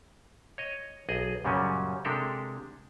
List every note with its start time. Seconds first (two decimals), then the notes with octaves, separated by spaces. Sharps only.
0.58 C#5 D#5
1.09 B1 G#4 D#5
1.45 F#2 A#2 C#3 F#3 G3 C#4
2.05 C3 G#3 D4 G4 A4 A#4